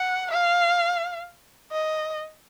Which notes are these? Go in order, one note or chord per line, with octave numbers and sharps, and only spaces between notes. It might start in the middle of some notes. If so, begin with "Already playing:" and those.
Already playing: F#5
F5
D#5